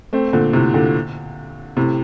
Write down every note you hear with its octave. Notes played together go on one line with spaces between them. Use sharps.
A3 C4
A#2 D3
A2 C3
A#2 D3
A2 C3